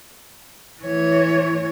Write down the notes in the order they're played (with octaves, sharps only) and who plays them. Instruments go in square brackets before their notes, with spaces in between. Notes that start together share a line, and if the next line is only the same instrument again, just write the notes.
[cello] E3 C#5